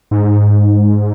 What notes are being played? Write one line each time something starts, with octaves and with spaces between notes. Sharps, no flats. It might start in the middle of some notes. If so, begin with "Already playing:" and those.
G#2